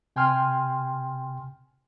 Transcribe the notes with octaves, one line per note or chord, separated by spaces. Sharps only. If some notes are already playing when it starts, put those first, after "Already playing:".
C3 G5 G#5 C6 F6